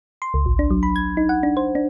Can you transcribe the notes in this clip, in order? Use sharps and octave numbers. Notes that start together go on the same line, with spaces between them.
C6
C#2
A1
D4
F#3
B5
G#6
D#4
F#5
D4
C5
D4